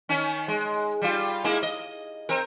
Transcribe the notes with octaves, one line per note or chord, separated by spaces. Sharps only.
D#3 C#4
G#3
G3 F4
G#3 A#3 E4
D#5
C4 A#4